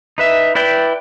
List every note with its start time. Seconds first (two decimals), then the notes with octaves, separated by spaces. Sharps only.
0.18 D#4 B4 E5
0.55 E4 B4 D5 G5